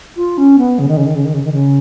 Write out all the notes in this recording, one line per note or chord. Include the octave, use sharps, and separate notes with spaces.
F4
C#4
B3
C#3
D#3
C#3
D#3
C#3
D#3
C#3
D#3
C#3